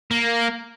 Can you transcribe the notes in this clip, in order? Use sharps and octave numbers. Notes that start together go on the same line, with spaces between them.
A#3